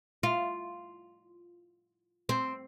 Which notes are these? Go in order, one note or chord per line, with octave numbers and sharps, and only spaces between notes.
F4
C4